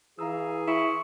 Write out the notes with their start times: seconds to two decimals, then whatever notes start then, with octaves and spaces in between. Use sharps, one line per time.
0.19 E3 G#4 F5 A#5 E6
0.67 E4 C6 C#6 C#7